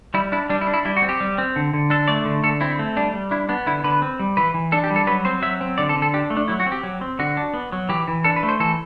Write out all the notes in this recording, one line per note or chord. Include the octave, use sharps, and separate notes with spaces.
G3 E4
D4 E4
G3 D4
E4
D4
E4
G3 E4
F#4
C4
G4
G3
C4
D3
D3
D4 A4
A3 D5
D3
D3 A4
C4 E4
A3
G3 D4
G3
D4 E4
B3 D4
D3 E4
D3 B4
C4
G3
E3 B4
E3
D4 A4
G4
G3
A4
F#3 B4
C4 C5
F#3 E5
C4
D3 D5
A4
D3
A4
D4 G4
A3
D4
F#3 E4
F#4
C4
G4
F#3
C4
D3 F#4
D4
B3
F#3
E3 G4
E3
D4 A4
B4
A3
C5
E3 A4